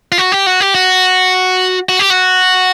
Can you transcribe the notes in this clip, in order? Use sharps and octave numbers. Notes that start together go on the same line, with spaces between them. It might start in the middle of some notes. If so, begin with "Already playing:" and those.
F4
F#4
G4
F#4
G4
F#4
F#4
G4
F#4